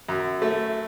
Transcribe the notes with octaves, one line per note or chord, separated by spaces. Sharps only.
F#2
A3